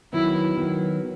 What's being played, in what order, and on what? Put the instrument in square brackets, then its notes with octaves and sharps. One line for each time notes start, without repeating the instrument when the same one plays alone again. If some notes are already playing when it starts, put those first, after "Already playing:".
[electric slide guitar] D#3 F#3 B3 [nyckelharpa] E4
[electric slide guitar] D#3 F#3 B3